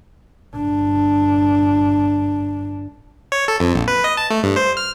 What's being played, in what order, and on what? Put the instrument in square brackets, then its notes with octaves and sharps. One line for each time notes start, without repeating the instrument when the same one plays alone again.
[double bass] G1 D4
[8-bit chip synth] C#5
A4
F2
A#1
B4
D#5
A5
A3
G2
C5
F6